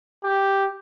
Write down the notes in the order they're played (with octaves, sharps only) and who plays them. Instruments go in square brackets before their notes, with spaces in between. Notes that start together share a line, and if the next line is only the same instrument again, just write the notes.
[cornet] G4